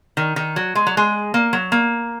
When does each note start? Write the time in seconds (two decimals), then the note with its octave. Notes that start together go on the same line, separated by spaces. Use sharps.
0.17 D#3
0.36 D#3
0.56 F#3
0.75 G#3
0.87 F#3
0.97 G#3
1.34 A#3
1.53 F#3
1.72 A#3